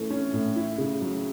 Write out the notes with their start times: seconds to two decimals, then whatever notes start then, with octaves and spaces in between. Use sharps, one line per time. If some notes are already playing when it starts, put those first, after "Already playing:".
Already playing: A2 E3 A3 C#4
0.10 C#4
0.33 A2
0.56 E4
0.78 C#3
1.01 F#3